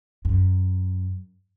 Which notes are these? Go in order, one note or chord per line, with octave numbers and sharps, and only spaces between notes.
F#2